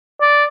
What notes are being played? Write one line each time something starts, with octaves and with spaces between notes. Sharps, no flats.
D5